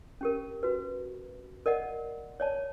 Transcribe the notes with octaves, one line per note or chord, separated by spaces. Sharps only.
C#4 G4 A#4
F#4 B4
A#4 D5 D#5 F#5
C#5 D5 A5